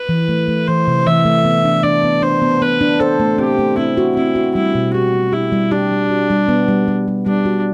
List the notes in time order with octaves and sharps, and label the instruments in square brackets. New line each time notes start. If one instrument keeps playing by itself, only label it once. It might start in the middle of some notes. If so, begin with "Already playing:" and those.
Already playing: [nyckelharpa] B4
[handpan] E3
A3
A3
[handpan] E3 [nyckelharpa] C5
[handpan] C3
[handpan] E3 [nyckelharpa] E5
[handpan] A3
B3
D4
[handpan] D4 [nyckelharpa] D5
[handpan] B3
[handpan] D4 [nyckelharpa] C5
[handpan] B3
[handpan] B3 [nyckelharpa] B4
[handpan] D4
[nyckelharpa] A4 [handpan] C5
[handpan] A3
[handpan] C4 [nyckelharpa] G4
[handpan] A3
[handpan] C4 [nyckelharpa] E4
[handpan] F#4
[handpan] C4 [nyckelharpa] E4
[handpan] F#4
[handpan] G3 [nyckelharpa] E4
[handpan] B2
[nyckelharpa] F#4 [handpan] G4
[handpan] G4
[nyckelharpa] E4 [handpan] G4
[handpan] G3
[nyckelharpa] D4 [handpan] G4
[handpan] G3
F#4
G3
B3
G3
G3
G3
[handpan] G3 [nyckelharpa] D4
[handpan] F#4